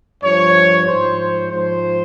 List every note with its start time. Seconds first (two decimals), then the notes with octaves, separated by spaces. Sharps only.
0.23 G2 F3 C#5
0.88 G#2 F3 C5
1.20 C5
1.52 G#2 F3 C5